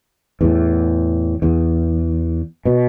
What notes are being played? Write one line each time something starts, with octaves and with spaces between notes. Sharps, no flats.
E2 A2
E2
B2